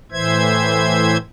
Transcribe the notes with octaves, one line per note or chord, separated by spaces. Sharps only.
A2 E3 C5 E5 G#6